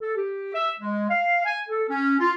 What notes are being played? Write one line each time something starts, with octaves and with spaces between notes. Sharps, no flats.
A4
G4
E5
G#3
F5
G#5
A4
C#4
F4